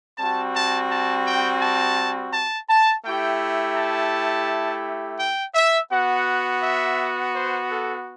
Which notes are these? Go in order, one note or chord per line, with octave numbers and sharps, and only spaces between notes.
G3 C4 F#4 A5
A5
A5
G5
A5
A5
A5
A3 E4 G4 G5
A5
G5
E5
B3 F#4 F#5
E5
C5
A4